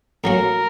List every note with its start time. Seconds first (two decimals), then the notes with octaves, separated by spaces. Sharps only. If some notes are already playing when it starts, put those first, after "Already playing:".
0.24 A2 F#3 A#3 C#4 F#4 A#4